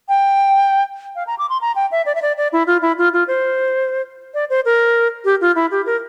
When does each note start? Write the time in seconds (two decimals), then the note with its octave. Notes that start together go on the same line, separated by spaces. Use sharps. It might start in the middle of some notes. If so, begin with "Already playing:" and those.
0.09 G5
1.15 F5
1.27 A#5
1.38 D6
1.50 C6
1.61 A#5
1.76 G5
1.91 E5
2.06 D5
2.15 E5
2.22 D5
2.37 D5
2.53 E4
2.67 F4
2.82 E4
2.98 F4
3.13 F4
3.27 C5
4.34 D5
4.50 C5
4.65 A#4
5.25 G4
5.41 F4
5.56 E4
5.71 G4
5.86 A#4